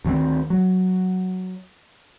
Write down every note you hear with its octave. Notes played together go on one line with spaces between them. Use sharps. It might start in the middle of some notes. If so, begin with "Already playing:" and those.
D2 D#3 A3 C4
F#3